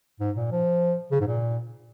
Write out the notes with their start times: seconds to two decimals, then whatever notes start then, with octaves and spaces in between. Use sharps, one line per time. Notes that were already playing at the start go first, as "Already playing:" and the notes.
0.20 G#2
0.36 A#2
0.52 F3
1.11 C#3
1.21 G#2
1.27 A#2